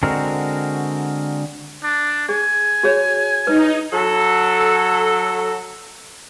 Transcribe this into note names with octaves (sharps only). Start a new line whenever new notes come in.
D3 G#3 C4 F#4 A#4
D4
G#4 G#5
F#4 G#4 C#5
D#4 B4
F#3 A4